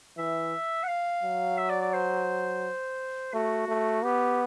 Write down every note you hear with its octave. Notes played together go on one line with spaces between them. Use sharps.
E3 E5
F#5
F5
F#3
E5
D5
D5
C5
A3 F#4
A3
B3 G4